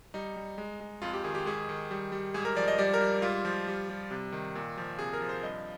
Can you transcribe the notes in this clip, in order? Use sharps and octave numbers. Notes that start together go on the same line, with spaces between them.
G3 D#4
G3
G#3
G#3
F2 F4
G4
D#3 G#4
G4
G#2 G#4
D#3
G3
G3
G#2 G#4
A#4
F3 D5
D#5
G3 D5
A#4
G3
G#2 F4
F3
G3
G3
C3
D#3
A#2
F3
C3 G#4
A#4
F3
C5
G2 D#5